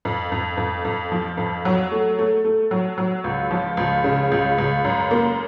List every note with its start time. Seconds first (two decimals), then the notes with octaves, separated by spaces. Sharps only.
0.05 F2
0.32 F2
0.57 F2
0.85 F2
1.12 F3
1.37 F2
1.65 F#3
1.91 A3
2.19 A3
2.44 A3
2.71 F#3
2.98 F#3
3.24 C#2
3.51 F3
3.77 C#2
4.04 C#3
4.32 C#2
4.58 C#2
4.85 F#2
5.11 A#3